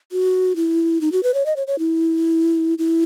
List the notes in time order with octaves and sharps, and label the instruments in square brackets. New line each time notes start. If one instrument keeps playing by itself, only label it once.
[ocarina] F#4
E4
D#4
F#4
B4
C#5
D#5
C#5
C#5
E4
E4